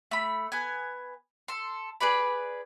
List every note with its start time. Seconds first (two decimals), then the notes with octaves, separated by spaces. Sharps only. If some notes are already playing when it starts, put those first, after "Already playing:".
0.11 A3 B5
0.52 B3 G#5
1.48 A4 C6
2.01 G#4 B4 D5 B5